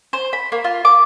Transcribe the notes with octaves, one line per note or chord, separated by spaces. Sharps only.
C5
B5
A#3
F4
D6